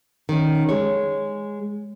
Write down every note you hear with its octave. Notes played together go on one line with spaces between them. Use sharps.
D#3 C#4
G#3 C#5